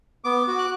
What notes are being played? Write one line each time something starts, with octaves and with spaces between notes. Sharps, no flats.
B3 D6
F#4
F#6